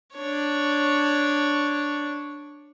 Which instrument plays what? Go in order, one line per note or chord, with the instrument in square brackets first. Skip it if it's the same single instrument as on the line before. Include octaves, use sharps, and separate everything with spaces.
[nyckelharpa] D4 C#5